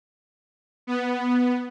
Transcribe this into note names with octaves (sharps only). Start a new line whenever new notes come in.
B3